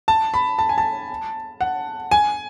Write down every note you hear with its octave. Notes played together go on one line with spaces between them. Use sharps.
A5
B5
A5
G#5
A5
F#5
G#5